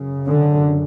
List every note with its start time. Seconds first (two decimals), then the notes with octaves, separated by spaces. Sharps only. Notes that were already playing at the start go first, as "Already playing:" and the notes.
Already playing: F#2 C#3
0.28 D3